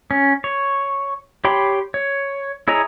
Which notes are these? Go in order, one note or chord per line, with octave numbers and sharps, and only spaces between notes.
C#4
C#5
G4 C#5 G5 B5 C6
C#5
E4 G#4 C#5 D#5 A#5